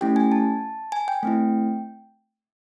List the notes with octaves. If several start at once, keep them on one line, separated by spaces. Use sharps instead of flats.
A3 C#4 E4 G4 G5
G#5
A5
G#5
G5
A3 C4 E4